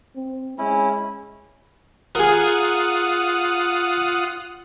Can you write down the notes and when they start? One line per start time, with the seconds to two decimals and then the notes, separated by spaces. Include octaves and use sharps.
0.16 C4
0.58 G#3 C#4 E4
2.15 F4 G#4 A#4 F#5 D#6